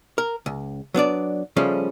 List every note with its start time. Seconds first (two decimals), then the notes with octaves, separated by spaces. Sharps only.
0.18 A#4
0.46 C#2
0.94 F#3 B3 D4 D5
1.56 C#3 F3 G3 A3 C#4